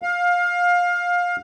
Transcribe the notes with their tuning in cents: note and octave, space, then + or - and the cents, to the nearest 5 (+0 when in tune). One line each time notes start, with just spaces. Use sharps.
F5 +20